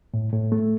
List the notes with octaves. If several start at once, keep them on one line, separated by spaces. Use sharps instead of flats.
A2
A2
A3